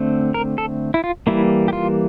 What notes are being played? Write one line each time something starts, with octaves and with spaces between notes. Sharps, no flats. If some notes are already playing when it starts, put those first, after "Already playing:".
Already playing: D3 A3 C4
A#4
A4
E4
F4
E3 G3 A#3 E4
G4
F4